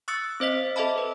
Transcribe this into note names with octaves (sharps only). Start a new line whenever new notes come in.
C#6 D#6 E6 F#6 A6 C#7
C4 C5 D#5 B6
A4 D#5 E5 A5 B5
B4